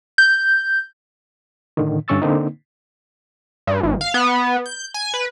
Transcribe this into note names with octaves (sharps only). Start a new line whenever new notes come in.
G6
A2 D3 D#3
G2 D3 C#4 C#6 E6 A6
D3 A#3 C4 D#4
G2
G#1
F5
B3
G6
G#5
B4